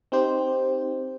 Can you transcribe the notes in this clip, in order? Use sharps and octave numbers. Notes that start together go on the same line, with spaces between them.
C4 D#4 G4 C5